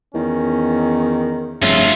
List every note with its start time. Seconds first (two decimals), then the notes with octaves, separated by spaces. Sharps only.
0.15 E2 D#3 C#4
1.62 F1 G2 C#3 F4 E5